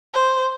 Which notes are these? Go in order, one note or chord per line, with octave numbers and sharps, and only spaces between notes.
C5